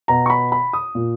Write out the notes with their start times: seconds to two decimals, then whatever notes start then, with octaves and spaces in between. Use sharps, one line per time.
0.08 B2 A#5
0.26 C#6
0.30 B5
0.52 B5
0.73 D#6
0.95 A#2